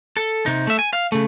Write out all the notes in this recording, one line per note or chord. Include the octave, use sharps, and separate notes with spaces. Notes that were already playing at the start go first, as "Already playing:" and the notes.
A4
C3 D#4
A3 E5
G#5
F5
C#3 A3